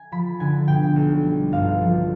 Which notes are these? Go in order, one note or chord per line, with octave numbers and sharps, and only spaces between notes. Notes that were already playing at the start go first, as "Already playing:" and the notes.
Already playing: G#5
F3 B5
D3 G#5
B2 G5
B1
G3
G1 F5
F3